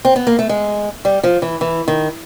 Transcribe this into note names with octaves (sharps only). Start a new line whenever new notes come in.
C4
B3
A#3
A3
G#3
G3
F3
E3
E3
D#3